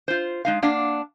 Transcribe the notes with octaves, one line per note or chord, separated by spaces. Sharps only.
F4 C5
G#3 D#4 F5
A#3 D4 F5 F#5